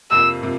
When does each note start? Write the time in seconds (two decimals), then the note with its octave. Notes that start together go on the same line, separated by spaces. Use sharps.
0.11 F2 C3 F3 A#3 E6
0.42 C3 F3 A#3